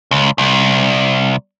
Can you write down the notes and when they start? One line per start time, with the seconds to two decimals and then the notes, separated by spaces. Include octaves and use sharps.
0.11 C#2
0.38 C2